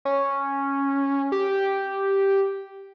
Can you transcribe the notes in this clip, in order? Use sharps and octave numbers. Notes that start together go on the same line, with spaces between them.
C#4
G4